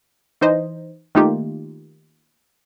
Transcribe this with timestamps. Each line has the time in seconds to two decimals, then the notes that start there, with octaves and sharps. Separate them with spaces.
0.41 E3 D#4 C5 D#5
1.15 D#3 A3 A#3 D#4 F4 G4